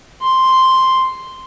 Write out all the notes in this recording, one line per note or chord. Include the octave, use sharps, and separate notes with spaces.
C6